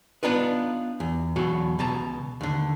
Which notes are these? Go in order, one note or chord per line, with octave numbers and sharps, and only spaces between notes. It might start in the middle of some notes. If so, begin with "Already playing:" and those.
B3 D4 D#4 F4 B4
E2
E2 B2 F#3 F#4
C#2 B2 A5 A#5
D#2 D3